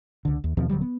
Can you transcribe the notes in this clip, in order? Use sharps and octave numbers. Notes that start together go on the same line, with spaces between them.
C#2 D3
D#2
D#2 B2 F3 C4
D#1 D3 F#3 G3
B3